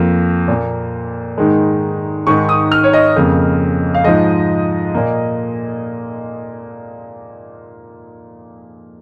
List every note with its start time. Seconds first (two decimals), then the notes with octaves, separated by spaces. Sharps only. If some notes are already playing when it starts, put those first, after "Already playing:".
Already playing: F2 F3 A#3
0.48 A#2 A#3
1.38 G#2 D#3 G#3
2.27 G#2 D#3 G#3 C#6
2.49 D#6
2.72 F6
2.84 C#5
2.93 D#5
3.16 F2 C#3 A#3
3.94 F5
4.04 G#2 F3 G#3 D#5
4.94 A#2 A#3